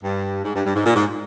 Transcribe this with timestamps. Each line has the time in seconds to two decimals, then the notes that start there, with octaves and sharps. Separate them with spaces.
0.04 G2
0.44 G#2
0.55 G2
0.66 G2
0.75 G#2
0.86 A#2
0.96 G#2